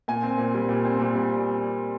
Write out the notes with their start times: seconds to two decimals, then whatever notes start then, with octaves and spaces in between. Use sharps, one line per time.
0.08 A#2 G#5
0.23 C4
0.38 A#2
0.54 G3
0.69 A#2
0.85 C4
0.99 A#2
1.15 G3